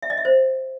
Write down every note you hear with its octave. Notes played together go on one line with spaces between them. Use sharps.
E5
D#5
E5
C5